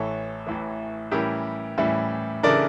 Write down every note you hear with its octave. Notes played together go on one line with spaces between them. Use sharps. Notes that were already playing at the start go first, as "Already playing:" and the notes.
Already playing: A1 A2 E3 A4 C#5
A1 A2 E3
A2 E3 G3 C#4 E4 G4 A#4
A2 E3 G3 C#4 E4
C#3 E3 A3 D4 A#4 D5